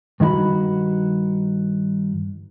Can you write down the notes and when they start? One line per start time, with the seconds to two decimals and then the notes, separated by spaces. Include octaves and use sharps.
0.20 G2 D#3 E4 F#4 B5